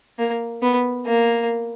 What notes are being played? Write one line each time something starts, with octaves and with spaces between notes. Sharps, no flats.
A#3
B3
A#3